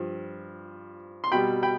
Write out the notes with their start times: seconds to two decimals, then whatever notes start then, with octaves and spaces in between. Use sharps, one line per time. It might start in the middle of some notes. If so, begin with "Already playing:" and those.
Already playing: G2 F3
1.24 C6
1.32 B2 G3 G5 B5
1.63 G5 B5